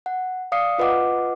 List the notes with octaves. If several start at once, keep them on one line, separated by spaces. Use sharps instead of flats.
F#5
D5 F5 D#6 C7 C#7
F4 B4 D#5 F#5 D6